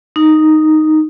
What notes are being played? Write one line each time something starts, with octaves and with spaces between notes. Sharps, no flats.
D#4